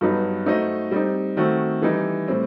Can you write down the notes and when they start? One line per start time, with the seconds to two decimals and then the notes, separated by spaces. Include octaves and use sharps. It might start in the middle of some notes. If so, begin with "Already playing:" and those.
0.01 G2 F#3 B3 D#4
0.46 A3 D#4 F#4 C5 D#5
0.91 G3 C4 D#4
1.37 D#3 A3 C4 F#4
1.82 E3 G3 D#4
2.28 A2 G3 C4